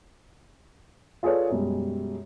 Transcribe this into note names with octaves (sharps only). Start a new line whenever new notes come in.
F4 G#4 A4 B4 C#5 D5
F#2 B2 G3 G#3